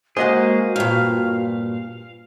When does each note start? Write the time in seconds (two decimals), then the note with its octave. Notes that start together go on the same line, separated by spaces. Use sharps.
0.17 G#3 A#3 F#4 G#4 C5 D#5 F#5
0.76 G2 A#2 F5